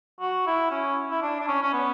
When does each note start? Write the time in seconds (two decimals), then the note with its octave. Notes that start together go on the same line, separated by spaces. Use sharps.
0.21 F#4
0.47 E4
0.71 C#4
1.10 E4
1.22 D4
1.41 D4
1.48 C#4
1.63 C#4
1.73 B3